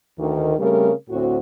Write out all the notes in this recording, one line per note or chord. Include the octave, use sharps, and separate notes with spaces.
D2 D#3
C#3 G3 A3 C4 A#4
D2 A2 C4 F#4